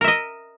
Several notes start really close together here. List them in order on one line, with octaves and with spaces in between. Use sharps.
A#4 E5 D#5